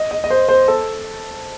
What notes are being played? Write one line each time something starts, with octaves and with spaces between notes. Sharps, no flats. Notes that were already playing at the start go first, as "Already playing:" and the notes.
Already playing: D#5
D#5
D#5
C5
C5
A4